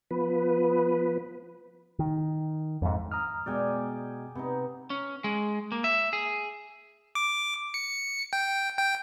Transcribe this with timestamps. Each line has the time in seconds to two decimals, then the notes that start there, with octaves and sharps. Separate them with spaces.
0.11 F3 B3 B4
1.99 D#3
2.82 F2 G#2
3.12 A#5 D#6 F6
3.46 B2 G#3 D5 G5 G#5
4.35 C3 B3 D#4
4.90 C#4
5.24 G#3
5.72 A#3
5.84 E5
6.13 G#4
7.15 D6
7.74 C#7
8.33 G5
8.77 G5